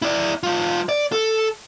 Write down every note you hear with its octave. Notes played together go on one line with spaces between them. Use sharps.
E4 D5
G3 F4
D5
A4